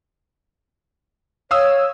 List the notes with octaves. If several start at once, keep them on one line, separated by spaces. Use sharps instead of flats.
C#5 F5 D#6 E6